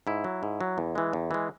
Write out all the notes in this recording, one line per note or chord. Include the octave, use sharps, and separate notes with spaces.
G#2 E4
F#3
G#2
F#3
E2
E3 G#3
E2
E3 G#3